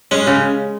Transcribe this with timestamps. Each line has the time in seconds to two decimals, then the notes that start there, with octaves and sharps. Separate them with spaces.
0.11 G#3 C#4
0.27 C#3